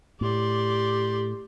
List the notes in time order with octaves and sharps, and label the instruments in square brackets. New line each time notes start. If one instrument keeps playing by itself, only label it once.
[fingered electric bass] A2 [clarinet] G4 [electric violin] D5 C6